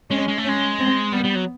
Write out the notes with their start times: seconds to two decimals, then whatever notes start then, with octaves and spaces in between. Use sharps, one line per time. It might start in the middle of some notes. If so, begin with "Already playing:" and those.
0.10 G#3 C#4
0.28 G#3
0.38 A3
0.45 G#3 C#4
0.79 C4
1.13 G3 B3
1.25 G3
1.36 F#3